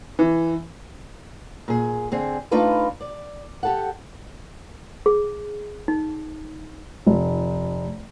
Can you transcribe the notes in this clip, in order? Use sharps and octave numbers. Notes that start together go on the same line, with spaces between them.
E3
A#2 G#4
D3 C4 G#4
A3 D4 D#4 F4 B4 F5
D5
G4 A4 F#5
G#4
D#4
F1